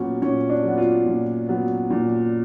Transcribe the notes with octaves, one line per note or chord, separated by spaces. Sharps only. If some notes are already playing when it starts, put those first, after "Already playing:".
Already playing: A#2 F#3 B3 C#4
A#2 C#4
D4
F#3
B3
F4
A#2
F#3 B3
A#2